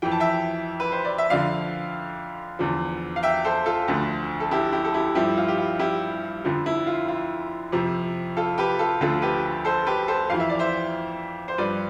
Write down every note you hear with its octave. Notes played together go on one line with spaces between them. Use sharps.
F2 E3 G5
A5
E5 G5
B4
C5
D5
E5
F2 D3 F3 D5 F5
E2 D3 F3
F5
E5 G5
A4 C5
F4 A4
D2 D3 F3
A4
E4 G4
E4 G4
A4
E4 G4
G2 F3 E4 G4
F4
G4
F4
E4 G4
F2 D3 F3
E4
F4
F4
F2 C3 F3
F4 A4
G4 B4
F4 A4
D2 D3 F3 F4 A4
G4 B4
A4 C5
G4 B4
A4 C5
F2 E3 F5
E5
D5
C5 E5
C5
G2 F3 B4 D5